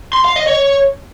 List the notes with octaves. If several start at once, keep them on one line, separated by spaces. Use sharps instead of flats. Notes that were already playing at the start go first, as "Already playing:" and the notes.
C6
F5
D#5
C#5